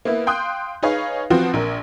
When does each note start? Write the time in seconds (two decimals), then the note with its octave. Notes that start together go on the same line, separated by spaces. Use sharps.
0.05 A#3 B3 E4
0.27 F5 G5 C6 D#6 F#6 G6
0.83 D#4 G#4 B4 C#5 F5
1.30 F3 B3 C4 F4 F#4
1.53 A#1 A#4